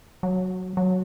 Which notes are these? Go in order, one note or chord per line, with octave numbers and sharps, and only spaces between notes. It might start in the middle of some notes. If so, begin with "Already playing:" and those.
F#3
F#3